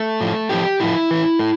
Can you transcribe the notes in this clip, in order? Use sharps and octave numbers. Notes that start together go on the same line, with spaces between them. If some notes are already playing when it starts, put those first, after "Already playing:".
Already playing: A3
A2 F3
A2 F3 G4
A2 F3 E4
A2 E3
A2